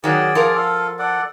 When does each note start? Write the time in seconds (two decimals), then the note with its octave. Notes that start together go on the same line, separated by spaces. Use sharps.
0.04 D#3 F#3 G#4 D5
0.35 F3 A#4
0.55 F4 A4
0.99 A4 D5 F#5